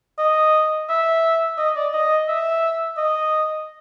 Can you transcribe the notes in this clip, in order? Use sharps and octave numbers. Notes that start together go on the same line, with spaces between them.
D#5
E5
D#5
D5
D#5
E5
D#5